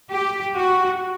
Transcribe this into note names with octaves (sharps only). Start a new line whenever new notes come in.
G4
F#4